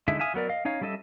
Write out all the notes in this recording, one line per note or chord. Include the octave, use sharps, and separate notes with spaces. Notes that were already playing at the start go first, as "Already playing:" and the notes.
D3 G#3 D#4 E4 E5
E5 F5 G#5 D#6
F#3 B3 A#4 D5
D#5 F5
C#4 D#4 C#5 F5
G3 C#4 A4 D#5 E5